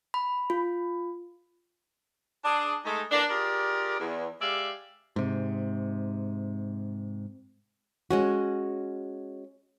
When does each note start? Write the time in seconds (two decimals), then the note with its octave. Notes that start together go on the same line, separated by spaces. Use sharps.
0.14 B5
0.50 F4
2.45 D4 G#4
2.85 G#3 A3 D#4
3.11 E3 A#3 D4
3.30 F4 G4 G#4 A#4 D5
3.99 E2
4.42 G#3 G4 D5 E5 F5
5.16 G#2 C3
8.11 G#3 C#4 F#4